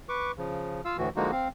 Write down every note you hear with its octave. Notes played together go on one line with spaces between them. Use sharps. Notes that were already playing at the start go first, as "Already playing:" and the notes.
B4 C#6 D6
C#3 F3
F4 F5 E6
D2 A2 E3 F#4
D3 F3 G#3 A#3 D#4 F#4
C4 F5